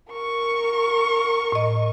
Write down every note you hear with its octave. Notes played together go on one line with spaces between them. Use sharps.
A#4 C#6
A2 D#5